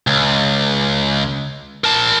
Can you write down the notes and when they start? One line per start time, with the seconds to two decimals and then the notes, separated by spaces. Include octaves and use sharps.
0.07 C#2
1.84 A#4 A5